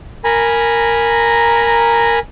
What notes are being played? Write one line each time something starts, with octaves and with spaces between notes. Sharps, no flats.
A#4 G#5 A#5 B5